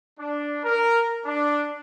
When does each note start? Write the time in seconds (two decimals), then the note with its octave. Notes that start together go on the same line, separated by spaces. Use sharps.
0.20 D4
0.64 A#4
1.26 D4